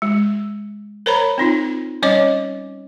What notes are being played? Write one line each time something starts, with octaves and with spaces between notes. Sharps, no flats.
G#3
A#4 C5 C#5 A#5 B5
C4 D#4 F4
G3 C#4 C#5 D#5 D6